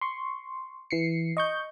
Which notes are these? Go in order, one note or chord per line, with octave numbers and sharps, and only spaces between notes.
C6 C#6
E3 C7 C#7
D#5 C#6 G6